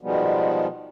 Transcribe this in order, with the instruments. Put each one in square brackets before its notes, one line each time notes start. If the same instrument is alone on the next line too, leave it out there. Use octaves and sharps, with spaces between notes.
[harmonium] B2 D#3 F3 G3 G#3 B3